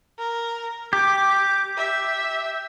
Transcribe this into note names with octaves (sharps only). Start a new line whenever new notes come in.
A#4
G4 D6
E5